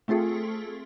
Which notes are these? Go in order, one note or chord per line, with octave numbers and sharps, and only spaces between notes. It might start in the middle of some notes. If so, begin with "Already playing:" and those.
A3 C4 F4 G#4 A4